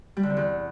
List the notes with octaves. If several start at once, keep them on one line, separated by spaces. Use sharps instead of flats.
G3
D3
C3
E2